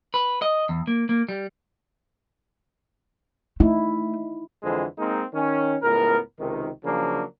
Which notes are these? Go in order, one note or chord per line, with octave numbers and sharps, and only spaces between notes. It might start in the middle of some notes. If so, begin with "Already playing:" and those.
B4
D#5
E2
A#3
A#3
G3
A3 D#4 E4
F2 D3 E3 G#3 C5
G#3 A#3 C4 D#4
D#3 C#4
C#2 A2 B3 A#4
C#2 C3 D#3
C#3 F3 F#3 A#3 D4